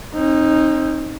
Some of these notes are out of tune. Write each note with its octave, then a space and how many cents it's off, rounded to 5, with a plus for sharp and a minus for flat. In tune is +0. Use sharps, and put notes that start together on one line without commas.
C4 +45 D#4 +0